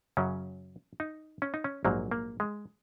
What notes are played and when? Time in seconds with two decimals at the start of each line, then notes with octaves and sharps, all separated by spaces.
0.17 F#2 C#3 F#3 C#4
1.00 D#4
1.42 C#4
1.54 D#4
1.64 C#4
1.85 A#1 G#2 F#3 A#3
2.11 A#3
2.40 G#3